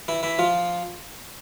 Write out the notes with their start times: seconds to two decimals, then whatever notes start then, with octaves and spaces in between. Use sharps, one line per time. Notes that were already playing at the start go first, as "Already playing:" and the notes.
0.08 E3 E4
0.23 E3 E4
0.39 F3 F4